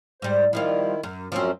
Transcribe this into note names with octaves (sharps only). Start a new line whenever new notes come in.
G#2 G3 C5
D#3 F3 G3 E4 F4
F#2
F#2 F3 F#3 C4 C#4